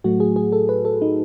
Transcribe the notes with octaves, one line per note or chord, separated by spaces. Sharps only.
A2 F#3 A3 F#4
G#4
G#4
A4
B4
A4
D#4